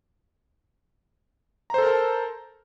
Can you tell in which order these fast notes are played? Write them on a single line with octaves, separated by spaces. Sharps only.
A#5 C5 A4 A#4 A5